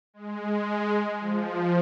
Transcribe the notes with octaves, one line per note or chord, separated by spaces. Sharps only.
G#3
F3